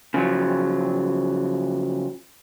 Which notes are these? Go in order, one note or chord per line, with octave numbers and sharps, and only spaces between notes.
C#3 F3 F#3